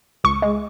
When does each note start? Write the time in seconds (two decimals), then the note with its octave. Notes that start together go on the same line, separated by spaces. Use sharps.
0.24 C#2 C#6
0.42 G#3